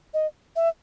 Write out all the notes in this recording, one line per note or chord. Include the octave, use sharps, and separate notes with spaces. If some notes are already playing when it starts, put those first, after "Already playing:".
D#5
E5